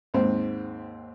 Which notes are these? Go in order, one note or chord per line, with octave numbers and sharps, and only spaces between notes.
D#2 G#2 C4